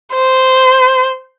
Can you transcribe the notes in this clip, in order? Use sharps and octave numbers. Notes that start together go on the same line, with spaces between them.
C5